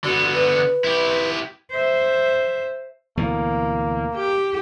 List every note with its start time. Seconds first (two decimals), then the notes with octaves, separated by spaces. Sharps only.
0.04 D3 B3 F#4
0.34 B4
0.84 E4 G4
1.71 C5 E5
3.17 D2 B2 E3 A#3
4.16 G4